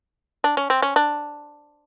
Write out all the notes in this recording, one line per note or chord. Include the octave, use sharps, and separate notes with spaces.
D4
C#4
C4
C#4
D4